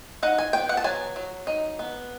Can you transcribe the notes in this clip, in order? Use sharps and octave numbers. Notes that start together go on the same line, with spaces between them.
D#4 F#5
G#5
B3 G5
F#5
A5
F#3 G#5
F#3
D#4
B3